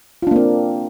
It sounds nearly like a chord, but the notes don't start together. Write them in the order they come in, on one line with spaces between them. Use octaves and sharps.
F4 D4 A#3 C4